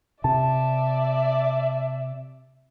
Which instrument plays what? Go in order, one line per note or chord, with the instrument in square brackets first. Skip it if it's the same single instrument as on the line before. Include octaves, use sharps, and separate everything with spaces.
[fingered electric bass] C3 [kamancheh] D5 E5 [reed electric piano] A5